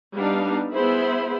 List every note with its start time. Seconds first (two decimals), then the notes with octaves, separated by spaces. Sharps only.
0.16 G3 B3 D4 D#4 F5
0.72 B3 E4 G#4 C5 E5 B5